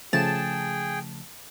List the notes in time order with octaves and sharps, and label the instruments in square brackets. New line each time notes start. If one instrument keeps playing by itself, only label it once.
[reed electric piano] C#3 F3 A3 [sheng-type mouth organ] G#4 G5 [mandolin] A5